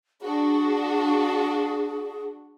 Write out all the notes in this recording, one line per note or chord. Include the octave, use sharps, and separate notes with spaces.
D4 F#4 G#4